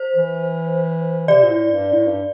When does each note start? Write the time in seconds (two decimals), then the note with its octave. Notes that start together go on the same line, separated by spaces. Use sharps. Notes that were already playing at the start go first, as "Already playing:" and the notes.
Already playing: C5
0.15 E3
1.28 C3 D5
1.43 A#2
1.50 A2
1.71 G2
1.93 A2
2.07 G2